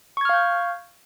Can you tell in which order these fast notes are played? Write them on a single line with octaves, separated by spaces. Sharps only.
C#6 G#6 F6 F5 G6